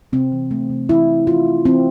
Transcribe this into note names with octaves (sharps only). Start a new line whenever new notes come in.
C3 C4
E3
A3
C3
E3 E4
E3
E3 F4
A3
E3 C4